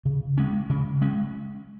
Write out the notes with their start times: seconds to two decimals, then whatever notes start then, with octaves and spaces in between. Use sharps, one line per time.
0.05 C#3
0.38 G#3 C#4
0.70 C#3
1.02 G#3 C#4